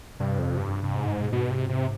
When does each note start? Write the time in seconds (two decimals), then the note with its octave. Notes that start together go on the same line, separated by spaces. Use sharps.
0.19 G2 C3
0.39 F2
0.57 G2
0.82 G2 C3
0.94 G#2
1.07 G2
1.22 B2
1.32 G#2 B2
1.50 C3
1.69 C3